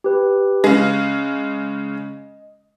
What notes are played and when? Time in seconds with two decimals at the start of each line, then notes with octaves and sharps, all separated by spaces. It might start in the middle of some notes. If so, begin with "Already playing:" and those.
0.04 G4 B4
0.64 C#3 G#3 D#5